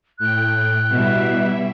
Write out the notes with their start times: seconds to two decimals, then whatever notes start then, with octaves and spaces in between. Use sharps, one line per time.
0.19 A2 G5 F#6
0.92 B2 G3 E4 E5